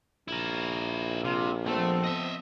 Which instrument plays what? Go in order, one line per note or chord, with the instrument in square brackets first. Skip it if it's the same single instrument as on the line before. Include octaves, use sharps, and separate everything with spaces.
[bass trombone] A#1 [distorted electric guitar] E4 A#4
[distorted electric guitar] C3 [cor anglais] F4
[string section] F3 B3 C4 [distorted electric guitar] A3 [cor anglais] A4
[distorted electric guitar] D#5 E5